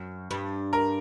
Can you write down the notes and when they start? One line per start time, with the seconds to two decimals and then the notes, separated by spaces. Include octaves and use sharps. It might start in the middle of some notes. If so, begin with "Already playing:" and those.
Already playing: F#2
0.31 G2
0.73 A#4